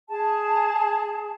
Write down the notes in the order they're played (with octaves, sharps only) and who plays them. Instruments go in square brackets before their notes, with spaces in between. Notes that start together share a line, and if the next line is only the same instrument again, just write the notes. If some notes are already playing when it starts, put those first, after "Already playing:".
[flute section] G#4 A5